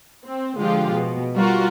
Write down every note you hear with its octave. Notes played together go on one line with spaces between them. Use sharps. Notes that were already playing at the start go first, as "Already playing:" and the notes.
C4
D3 F3 G#3 F4 G4
B2
G3 F4 F#4 A#4